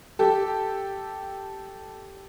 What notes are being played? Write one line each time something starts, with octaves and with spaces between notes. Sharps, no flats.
G4 A4